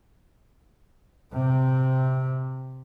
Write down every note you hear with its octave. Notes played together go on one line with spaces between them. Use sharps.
C3 C4